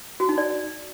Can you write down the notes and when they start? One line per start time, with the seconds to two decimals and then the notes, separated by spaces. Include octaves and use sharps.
0.20 F#4
0.29 D#4
0.38 D5